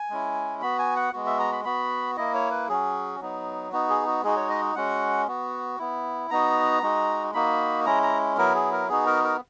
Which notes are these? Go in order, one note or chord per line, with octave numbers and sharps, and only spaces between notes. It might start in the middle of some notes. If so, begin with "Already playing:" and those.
Already playing: G#5
G#3 C#4 E4
B3 F#4 B5
G#5
F#5
G#3 B3 F#4
E5
A#5
B5
B3 F#4 B5
A#3 E4 D#5
C#5
B4
F#3 C#4 F#4 G#4
F#3 B3 D#4
B3 D#4 F#4
G#4
F#4
G#3 D#4 F#4 G#4
C#5
D#5
G#3 C#4 F#4 F#5
B3 F#4
B3 E4
B3 D#4 F#4 A#5
G#3 D#4 F#4
A#3 D#4 F#4 B5
G#3 C#4 E4 A#5
A#5
F#3 B3 E4 A#4
G#4
A#4
B3 D#4 F#4 G#4
A#4
A#4